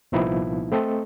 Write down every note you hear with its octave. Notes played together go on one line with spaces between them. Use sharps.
C2 A#2 F3 B3 D#4 E4
A3 C4 A4 D#5